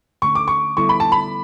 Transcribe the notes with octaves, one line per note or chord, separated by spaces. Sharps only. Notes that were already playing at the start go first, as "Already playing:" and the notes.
D3 A3 C#4 C#6
D6
C#6
D3 G3 B3 E4 A4 C#6
B5
A5
B5